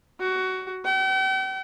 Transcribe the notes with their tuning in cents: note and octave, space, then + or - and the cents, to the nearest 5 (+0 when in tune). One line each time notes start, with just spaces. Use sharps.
F#4 +15
G5 -45